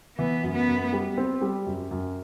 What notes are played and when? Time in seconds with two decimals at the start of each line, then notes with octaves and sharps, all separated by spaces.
0.18 E3 B3
0.43 F#2
0.55 B3
0.68 F#2
0.93 G3
1.18 C4
1.41 G3
1.66 F#2
1.91 F#2